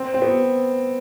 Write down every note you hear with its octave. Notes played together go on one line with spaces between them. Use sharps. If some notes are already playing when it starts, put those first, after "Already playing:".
Already playing: C4
C4
B3